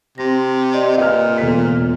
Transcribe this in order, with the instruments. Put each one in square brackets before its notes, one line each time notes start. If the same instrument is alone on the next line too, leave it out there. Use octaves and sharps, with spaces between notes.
[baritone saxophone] C3 [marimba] C4 A#6
[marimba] D5 D#5 C6
[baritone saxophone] A#2 [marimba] B4 [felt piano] D#5 F6
[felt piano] E1 B6 [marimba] A4